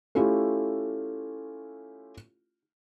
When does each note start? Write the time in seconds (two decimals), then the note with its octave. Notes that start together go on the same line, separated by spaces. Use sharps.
0.15 A3 C#4 E4 F4 G4